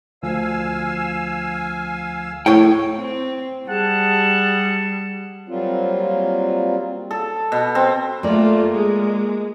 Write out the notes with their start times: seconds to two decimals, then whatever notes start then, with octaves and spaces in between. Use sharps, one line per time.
0.23 D2 F3 F5 G#5 E6
2.46 A2 C#5 G5
2.97 C4
3.68 G3 G#4 F#5 A5
5.49 F#3 G3 A#3 C4 F4
7.11 A4
7.52 B2
7.75 C4
8.23 A3 A#3 F4 D5
8.72 G#3